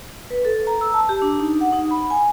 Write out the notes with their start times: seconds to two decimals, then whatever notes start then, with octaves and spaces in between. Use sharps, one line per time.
0.30 B4
0.45 A4
0.67 A#5
0.81 E6
0.94 A5
1.09 G4
1.22 D4
1.40 D#4
1.61 F#5
1.73 D#4
1.91 B5
2.10 G#5